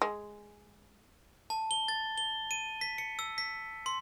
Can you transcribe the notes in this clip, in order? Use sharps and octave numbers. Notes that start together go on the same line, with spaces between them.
G#3
A5
G7
A6
G7
D#7
B6
C#7
E6
B6
C6